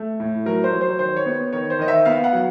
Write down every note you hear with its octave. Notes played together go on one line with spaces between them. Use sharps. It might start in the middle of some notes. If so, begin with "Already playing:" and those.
Already playing: A3
A2
F#3 A#4
C5
F#3
C5
D#3 C5
C#5
B3
D#3 C#5
C5
D#3 D#5
E5
B3 F5
F#5
F#3